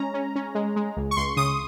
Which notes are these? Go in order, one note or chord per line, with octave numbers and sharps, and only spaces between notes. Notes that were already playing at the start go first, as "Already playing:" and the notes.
Already playing: G#3 C#4 A#5
C#4
C#4
G#3
G#3
C#2
C#6
C#2 C6
C#3 D#6